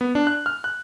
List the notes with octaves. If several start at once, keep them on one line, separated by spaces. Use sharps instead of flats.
B3
D4
F#6
F6
F#6